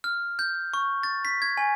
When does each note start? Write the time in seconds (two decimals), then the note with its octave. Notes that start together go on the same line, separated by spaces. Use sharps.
0.04 F6
0.39 G6
0.74 C#6
1.03 A6
1.25 B6
1.42 G#6
1.57 G#5